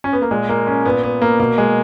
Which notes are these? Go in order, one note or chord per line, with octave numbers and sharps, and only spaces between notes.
C#4
B3
A#3
A#2 G#3
A#3
C#4
A#2 B3
B3
A#3
B2 A#3
G#3